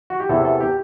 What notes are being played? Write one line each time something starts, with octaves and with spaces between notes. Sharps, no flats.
F#4
G4
E2 C3 E3 A4
A4
G4